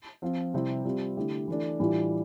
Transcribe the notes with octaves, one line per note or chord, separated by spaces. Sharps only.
F3 C4 F4
C3 G3 C4 E4 G4
G3 C4 F4
D3 A3 E4 G4
E3 A3 D4
A2 E3 G3 D4 F4